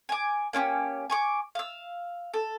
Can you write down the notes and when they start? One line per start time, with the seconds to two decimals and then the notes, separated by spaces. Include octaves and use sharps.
0.09 G#5 D6
0.53 A#3 C#4 F4 G4
1.10 G#5 C#6 D6
1.55 F5 E6
2.34 A4